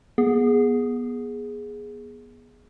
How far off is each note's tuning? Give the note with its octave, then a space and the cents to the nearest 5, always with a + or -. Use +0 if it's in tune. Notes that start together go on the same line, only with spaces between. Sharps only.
B3 -25 G#4 +0